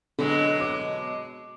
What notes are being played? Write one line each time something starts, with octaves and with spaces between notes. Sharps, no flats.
B2 D3 F#3 G#3
D6